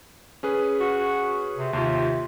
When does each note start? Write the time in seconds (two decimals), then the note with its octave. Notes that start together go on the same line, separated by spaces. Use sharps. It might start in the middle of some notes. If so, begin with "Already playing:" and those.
0.43 C#4 G#4 B4
0.80 F#4
1.57 C3
1.73 D#2 C3 F4